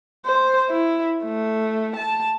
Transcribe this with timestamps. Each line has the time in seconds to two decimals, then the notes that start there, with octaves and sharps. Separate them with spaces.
0.26 C5
0.70 E4
1.24 A3
1.97 A5